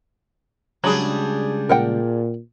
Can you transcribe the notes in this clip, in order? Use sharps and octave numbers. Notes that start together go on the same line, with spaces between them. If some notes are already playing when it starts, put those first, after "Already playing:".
C#2 F#3 G3 D4 G#4 B5
A#2 A#4 F#5 G5